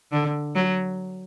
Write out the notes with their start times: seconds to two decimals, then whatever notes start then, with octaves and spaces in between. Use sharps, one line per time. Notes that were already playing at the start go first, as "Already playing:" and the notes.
0.12 D3
0.56 F#3